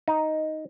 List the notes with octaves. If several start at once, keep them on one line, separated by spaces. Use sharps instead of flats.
D#4